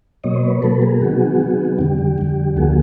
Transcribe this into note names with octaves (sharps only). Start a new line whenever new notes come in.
B2 F#3 A#3 C#5 D#5
C5
B4 C#5
B2 F#3 A#3 A4 B4
G#4 A#4
C3 D#3 F#3 B3 F#4 G#4
C3 D#3 F#3 B3
F2 D3 G3 G4
G4
F2 D3 G3
D2 D3 F3 A#3 F#4 G#4